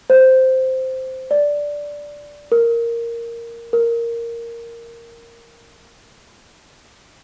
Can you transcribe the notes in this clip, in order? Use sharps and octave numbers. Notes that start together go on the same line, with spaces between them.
C5
D5
A#4
A#4